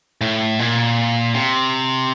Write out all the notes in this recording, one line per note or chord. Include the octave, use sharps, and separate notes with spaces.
A2
A#2
C3